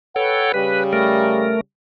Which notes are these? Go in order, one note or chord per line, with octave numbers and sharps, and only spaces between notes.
A4 B4 C#5 F#5 G5
C#3 G3 B4
A3 A#4